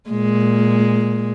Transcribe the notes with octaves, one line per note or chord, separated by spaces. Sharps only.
A#2 G#3